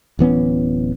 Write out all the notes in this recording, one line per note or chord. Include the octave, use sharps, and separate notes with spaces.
D1 E3 B3 C#4